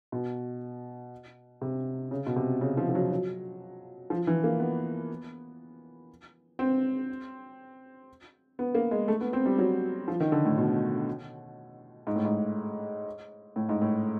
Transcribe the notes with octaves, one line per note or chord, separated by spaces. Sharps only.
B2
C3
C#3
B2
C3
C#3
F3
F3
F#3
F#3
F3
E3
A#3
B3
C4
B3
A#3
G#3
A3
B3
C4
G3
F#3
F3
D#3
D3
A2
B2
G#2
A2
G#2
A2
G#2
A2